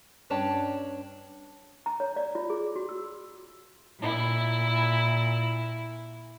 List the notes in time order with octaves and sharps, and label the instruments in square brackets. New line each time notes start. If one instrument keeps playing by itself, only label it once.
[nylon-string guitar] G2 C#4 D4 C#5 G5 A5
[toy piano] A#5
C#5
D5
F4
G#4
F#4
E6
[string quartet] A#2 E4